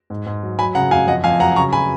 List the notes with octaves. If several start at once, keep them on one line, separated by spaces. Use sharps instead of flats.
G#2
G#2
F#3
F#3 G#5 B5
C#3 F#5 A#5
F#2 F5 G#5
F2 D#5 F#5
F2 F5 G#5
F#3 F#5 A#5
C#3 A#5 C#6
G#5 B5